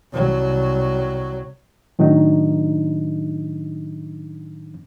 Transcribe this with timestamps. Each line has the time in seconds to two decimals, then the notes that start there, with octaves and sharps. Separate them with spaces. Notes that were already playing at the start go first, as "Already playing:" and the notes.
0.12 C2 F#3
1.99 A2 D#3 F#3 D4 D#4